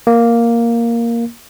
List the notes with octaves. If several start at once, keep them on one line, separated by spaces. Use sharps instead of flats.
A#3